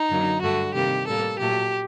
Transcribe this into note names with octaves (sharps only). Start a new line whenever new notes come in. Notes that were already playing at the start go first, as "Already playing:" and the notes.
Already playing: D#4
F#2 D3 F#3 A#3
G2 D3 A3 F#4
C3 D#3 G3 A#3 G4
A2 G3 A#3 A4
A#2 F#3 A3 G4